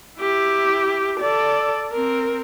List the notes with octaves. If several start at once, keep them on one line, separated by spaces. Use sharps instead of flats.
E4 G4
A4 D5
C4 A#4